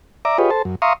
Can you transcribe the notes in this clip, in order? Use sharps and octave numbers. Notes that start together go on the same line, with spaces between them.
D5 E5 A#5 D6
F4 G4 G#4 B4 C#5 D#5
A4 C5 A5
F#2
E5 F5 A#5 C6 C#6 D#6